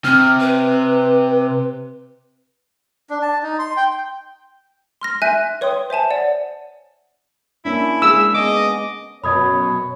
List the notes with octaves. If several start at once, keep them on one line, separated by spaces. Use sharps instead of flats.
C3 F6
B4
D4
A5
D#4
C6
G5
C6 F6 A#6
E5 G#5 F#6 G6 A#6 D#7
B4 C#5 G5 C6 D#6
C5 E5 G#5 A5
C#5 D5 F#5
A#3 C#4 D4 E4
G#3 G#4 F5 E6
B3 D#5 D6
F#2 B2 C#5 B5 D#6 G#6